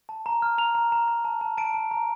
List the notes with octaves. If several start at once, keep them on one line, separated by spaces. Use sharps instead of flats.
A5
A#5
F6
A#5 F7
A#5
A#5
A#5
A5
A5
A5 D7
A5
A#5